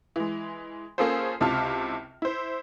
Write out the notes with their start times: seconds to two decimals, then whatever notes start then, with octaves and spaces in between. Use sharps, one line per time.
0.16 E3 G#3
0.98 A#3 C#4 F4 G#4 A4 C5
1.41 C#2 C3 E4 F4 A5 F6
2.22 E4 C5